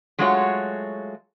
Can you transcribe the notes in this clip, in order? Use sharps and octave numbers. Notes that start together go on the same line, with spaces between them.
F#3 G#3 A3 F4 F#4 C#5